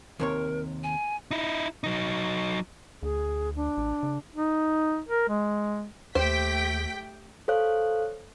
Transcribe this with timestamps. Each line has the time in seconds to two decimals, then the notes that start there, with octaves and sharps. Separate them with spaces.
0.20 D#2 C3 A#4 C#5
0.84 G#5
1.31 D#4 E4
1.84 F#3 D#4
3.03 D2 G#4
3.56 D4
3.77 A1
4.03 C#3
4.35 D#4
5.09 A#4
5.29 G#3
6.15 D#2 A3 G4 C5 G5 B6
7.48 A4 C5 C#5 F5 F#6